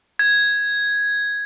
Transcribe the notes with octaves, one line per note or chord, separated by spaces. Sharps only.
G#6